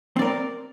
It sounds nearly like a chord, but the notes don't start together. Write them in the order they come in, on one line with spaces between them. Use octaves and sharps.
C4 D5 A#4